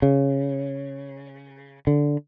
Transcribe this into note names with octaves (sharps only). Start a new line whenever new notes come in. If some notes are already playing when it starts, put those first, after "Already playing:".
C#3
D3